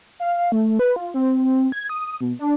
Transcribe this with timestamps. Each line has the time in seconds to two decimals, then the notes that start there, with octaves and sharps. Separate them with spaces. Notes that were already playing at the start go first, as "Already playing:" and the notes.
0.20 F5
0.52 A3
0.79 B4
0.96 F4
1.14 C4
1.72 G#6
1.89 D#6
2.21 B2
2.39 D4